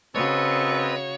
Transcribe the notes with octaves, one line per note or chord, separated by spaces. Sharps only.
C#3 C4 F#4 A4 B4 C#5 D#5